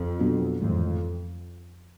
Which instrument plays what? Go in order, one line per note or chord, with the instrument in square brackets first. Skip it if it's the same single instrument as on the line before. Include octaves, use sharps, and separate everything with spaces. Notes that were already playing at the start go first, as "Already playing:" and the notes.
Already playing: [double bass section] F2
[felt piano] B2 F#3 B3 D4
[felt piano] A1 G#2 D#3 [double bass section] F2